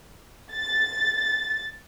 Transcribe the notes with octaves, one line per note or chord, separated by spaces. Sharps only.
A6